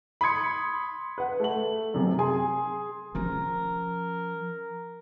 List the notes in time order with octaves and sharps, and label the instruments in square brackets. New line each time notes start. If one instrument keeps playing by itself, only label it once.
[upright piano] B5 C6 D#6 G#6 C#7
B4 F#5
A3 F#7
F#2 C3
G#4 G#5 C6
[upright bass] F3 C#4 [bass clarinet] A#4